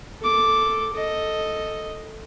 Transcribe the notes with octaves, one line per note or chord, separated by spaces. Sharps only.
A4 D6
A4 D#5